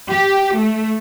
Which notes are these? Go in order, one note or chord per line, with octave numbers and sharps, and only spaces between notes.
G4
A3